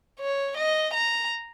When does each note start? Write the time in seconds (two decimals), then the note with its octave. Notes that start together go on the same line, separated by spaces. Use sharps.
0.20 C#5
0.58 D#5
0.94 A#5